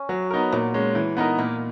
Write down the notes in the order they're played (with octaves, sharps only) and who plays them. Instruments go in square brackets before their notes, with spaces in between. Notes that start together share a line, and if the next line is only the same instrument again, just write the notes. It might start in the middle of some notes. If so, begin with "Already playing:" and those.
Already playing: [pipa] C#4
[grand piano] F#3
B3 D#4 A#4
[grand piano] A#2 [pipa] F#3
[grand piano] G#3 C#4
E3
B3 D#4 A#4
[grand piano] A#2 [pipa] A#3